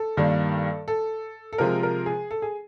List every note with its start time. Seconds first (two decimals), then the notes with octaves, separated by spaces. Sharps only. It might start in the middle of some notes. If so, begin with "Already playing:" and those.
Already playing: A4
0.17 G2 D#3 G3 A#3
0.88 A4
1.53 A4
1.58 C3 F3 G#3 A#4
1.83 A#4
2.06 G#4
2.31 A4
2.42 G#4